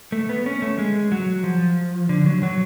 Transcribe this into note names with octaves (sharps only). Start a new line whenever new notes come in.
A3
B3
C#4
A3
G#3
F#3
F3
D3
F#3
F#3